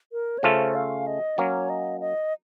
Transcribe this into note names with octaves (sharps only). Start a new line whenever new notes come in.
A#4
C#5
C#3 A3 C#4 F4 A4 C5
F5
D#5
F#3 A#3 C#4 C#5
D#5
D#5